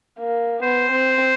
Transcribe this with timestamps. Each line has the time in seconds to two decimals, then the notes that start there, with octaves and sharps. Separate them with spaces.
0.20 A#3
0.62 B3 C5
0.92 C4